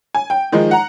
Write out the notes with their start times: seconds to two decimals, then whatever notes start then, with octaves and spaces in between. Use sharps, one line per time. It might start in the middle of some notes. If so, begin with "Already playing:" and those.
0.15 G#5
0.30 G5
0.52 D#3 F3 G#3 D#4
0.71 F#5 A#5